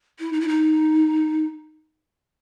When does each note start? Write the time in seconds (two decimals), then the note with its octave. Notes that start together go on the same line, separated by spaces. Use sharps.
0.19 E4
0.33 D#4
0.41 E4
0.48 D#4